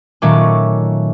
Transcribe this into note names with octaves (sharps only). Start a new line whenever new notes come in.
A#2 D#3 F#3 A3 C#4 D6